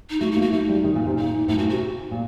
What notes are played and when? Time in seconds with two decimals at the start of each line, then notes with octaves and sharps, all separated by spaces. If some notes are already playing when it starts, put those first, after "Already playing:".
0.10 D#4
0.20 A3 F#4
0.32 A#3 D#4
0.42 F#4
0.52 A3 D#4
0.69 G3
0.84 D#3
0.95 A#2
1.06 C3
1.16 A#2 D#4
1.48 A2 D#4
1.58 A#2 F#4
1.69 C3 F#4
2.11 A#2